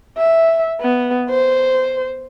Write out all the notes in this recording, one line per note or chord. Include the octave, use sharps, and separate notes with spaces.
E5
B3
C5